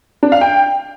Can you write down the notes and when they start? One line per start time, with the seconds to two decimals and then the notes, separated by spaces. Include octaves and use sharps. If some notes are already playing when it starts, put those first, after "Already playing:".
0.23 D4
0.32 F5
0.41 G5